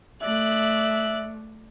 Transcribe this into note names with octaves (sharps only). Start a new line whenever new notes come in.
A3 D5 E5 F#6